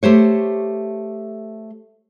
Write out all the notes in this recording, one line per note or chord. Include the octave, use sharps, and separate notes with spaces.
A3 G4 C5 C#5